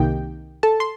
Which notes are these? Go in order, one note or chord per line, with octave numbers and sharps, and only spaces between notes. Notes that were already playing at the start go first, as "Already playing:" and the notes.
Already playing: C2 C3 D#3 A#3 D#4 G4 G5
A4 A5
C6